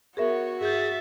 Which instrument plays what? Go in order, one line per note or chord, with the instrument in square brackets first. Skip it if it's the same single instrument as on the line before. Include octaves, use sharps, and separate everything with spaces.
[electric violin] B3 C#5 [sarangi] F#4 [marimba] G#4 A#4 E5
[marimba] G2 G6 [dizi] G#4 [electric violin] E5 A6